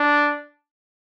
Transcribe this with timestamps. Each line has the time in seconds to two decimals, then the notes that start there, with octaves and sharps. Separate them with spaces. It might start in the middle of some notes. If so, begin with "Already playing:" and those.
Already playing: D4